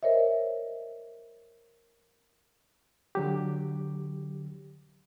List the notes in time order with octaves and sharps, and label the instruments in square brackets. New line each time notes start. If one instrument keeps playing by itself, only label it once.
[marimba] A#4 C5 C#5 D#5 E5
[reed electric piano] D3 F#3 G4